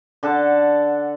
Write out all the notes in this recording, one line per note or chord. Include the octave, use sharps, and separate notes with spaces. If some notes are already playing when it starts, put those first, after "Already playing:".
D3 A4 F#5 A5